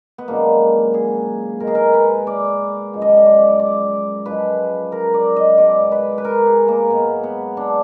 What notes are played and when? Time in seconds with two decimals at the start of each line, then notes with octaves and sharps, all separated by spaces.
0.18 B3
0.28 F#2 D3 F3 G#3 A#3
0.94 G#4
1.60 B2 G#3 A#4
1.67 G#4
1.75 A#4
1.94 B4
2.27 D5
2.93 F#2 F3 G#3
3.02 D#5
3.09 D5
3.17 D#5
3.26 D5
3.59 D5
4.26 F#2 F3 G#3 B4
4.92 A#4
5.14 D5
5.36 D#5
5.58 B2 G#3 D5
5.92 B4
6.18 B4
6.25 A#4
6.46 G#4
6.68 A#3
6.90 G#2 F#3 B3
7.23 B3
7.57 D4